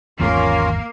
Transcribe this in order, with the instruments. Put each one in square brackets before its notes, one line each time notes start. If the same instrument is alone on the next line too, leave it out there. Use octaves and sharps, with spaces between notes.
[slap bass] G#1 E2 D#3 [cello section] A#3 [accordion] C#4 F4 A#4